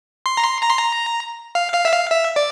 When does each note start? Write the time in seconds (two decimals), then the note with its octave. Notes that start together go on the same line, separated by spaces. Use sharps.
0.26 C6
0.37 A#5
0.44 C6
0.63 A#5
0.70 C6
0.78 A#5
1.55 F5
1.74 F5
1.85 E5
1.93 F5
2.11 E5
2.36 D5